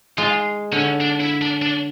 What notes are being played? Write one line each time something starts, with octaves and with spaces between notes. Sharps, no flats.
G#3 F4
D3 C#4
D4
E4
D4
D4